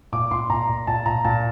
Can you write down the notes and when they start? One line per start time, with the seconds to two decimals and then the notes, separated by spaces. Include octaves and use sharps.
0.12 A#2 D6
0.31 A#2 C6
0.50 A#2 A#5
0.69 A#2
0.87 A#2 A5
1.06 A#2 A#5
1.25 A#2 A5